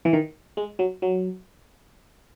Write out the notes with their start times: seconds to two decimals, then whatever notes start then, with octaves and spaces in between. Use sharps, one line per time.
0.05 E3
0.13 D#3
0.57 G#3
0.79 F#3
1.02 F#3